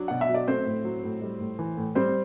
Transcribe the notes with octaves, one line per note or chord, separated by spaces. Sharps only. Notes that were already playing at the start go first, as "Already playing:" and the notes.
Already playing: F#3 D4
B2 F#5
E5
F#3
D5
A3 C4 C5
A2
F#3
A2
G3
A2
E3
A2
G3 C4 C5